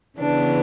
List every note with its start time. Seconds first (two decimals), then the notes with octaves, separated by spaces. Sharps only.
0.18 C#3 E3 B3 D4